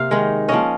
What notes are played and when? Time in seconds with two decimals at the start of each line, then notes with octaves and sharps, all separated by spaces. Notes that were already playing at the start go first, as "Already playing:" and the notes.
Already playing: C3 A#3 F5
0.11 D#3 G#3 D#4
0.48 F3 A#3 C#4 D#5